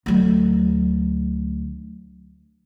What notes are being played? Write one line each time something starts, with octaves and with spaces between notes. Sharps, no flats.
D2 F#3